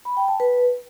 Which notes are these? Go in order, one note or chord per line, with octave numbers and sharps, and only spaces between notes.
B5
G5
A5
B4